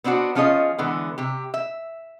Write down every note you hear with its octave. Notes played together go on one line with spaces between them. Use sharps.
B3 C4 D4 E4 F#4
F3 C#4 F4 G#4 D#5
D3 E3 G#3 B3
C3 G4
E5